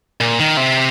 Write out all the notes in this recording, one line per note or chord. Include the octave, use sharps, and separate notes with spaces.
A#2
D#3
C3